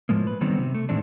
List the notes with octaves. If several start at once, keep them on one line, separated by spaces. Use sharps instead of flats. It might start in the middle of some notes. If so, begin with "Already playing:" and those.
A2 F3 G#3 A#3
B4
D3 D#3 F#3 G3 B3 C4
C3
A3
A2 D#3 E3 G#3 C4 D4